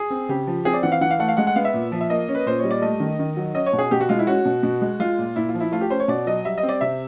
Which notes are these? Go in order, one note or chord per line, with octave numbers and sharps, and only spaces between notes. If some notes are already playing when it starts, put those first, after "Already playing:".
Already playing: G#4
C4
C#3 G4
F3
C4 G#4
D5
E3 F#5
F5
E3 F#5
F5
A3 F#5
F5
G#3 F#5
F#5
B3 F5
E5
A#2
F3
E5
A#3 D#5
C#4
B4
A#2 C5
G3 C#5
D5
A3 D#5
D#3
D#3
F#3
C#4 D#5
C#5
B2
G#4
B2 G4
F#4
G#3 F4
E4
C#4 F#4
B2
B2
G#3
G#3 F4
A#2
A#2 E4
F4
F3
E4
A3 F4
G4
C#4 C5
C#5
B2 D5
F#3 D#5
G3 E5
D#5
C4
D5
C3 E5